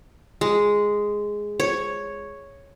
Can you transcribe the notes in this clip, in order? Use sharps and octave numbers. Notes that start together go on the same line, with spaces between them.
G#3
C#5